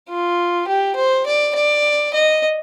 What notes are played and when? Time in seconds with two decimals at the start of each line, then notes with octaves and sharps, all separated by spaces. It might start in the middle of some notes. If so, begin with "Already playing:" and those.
0.09 F4
0.68 G4
0.96 C5
1.26 D5
1.55 D5
2.14 D#5